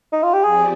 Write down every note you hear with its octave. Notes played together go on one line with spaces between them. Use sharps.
D#4
F4
G4
F3 C4 G4 G#4 D5